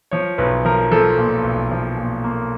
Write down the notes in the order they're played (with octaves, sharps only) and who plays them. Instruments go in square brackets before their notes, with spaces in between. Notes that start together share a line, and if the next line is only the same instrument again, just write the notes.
[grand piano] F3 C#5
B1 B4
F3 A#4
F3 A4
A#2
B1
F3
A#2
A#3